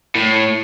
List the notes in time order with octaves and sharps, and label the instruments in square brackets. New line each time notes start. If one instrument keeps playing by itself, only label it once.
[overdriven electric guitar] A2